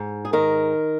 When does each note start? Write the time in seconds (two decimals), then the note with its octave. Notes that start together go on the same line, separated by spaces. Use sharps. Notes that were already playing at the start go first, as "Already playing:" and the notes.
Already playing: G#2
0.25 G#4
0.33 D#3 A#4